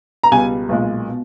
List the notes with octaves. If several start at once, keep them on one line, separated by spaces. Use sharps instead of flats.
A#5
C#2 B2 G3 G#5
B1 A#2 G#3
B2